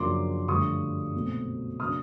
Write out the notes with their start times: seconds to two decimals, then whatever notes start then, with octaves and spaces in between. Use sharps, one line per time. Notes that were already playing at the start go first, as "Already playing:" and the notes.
Already playing: F#2 C#3 F3 A#3 D4 C6 D6
0.48 G2 D3 F3 A3 C#6 D#6
1.14 B1 A#2 F#3 A3 C4
1.80 C#3 F#3 A#3 D4 D#6 F6